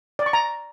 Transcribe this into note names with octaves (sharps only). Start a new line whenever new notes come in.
D5
C#6
A#5